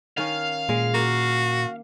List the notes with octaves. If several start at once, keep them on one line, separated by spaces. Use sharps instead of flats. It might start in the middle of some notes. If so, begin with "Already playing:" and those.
D#3 C#4 F5
A#2 G#3
A#3 F#4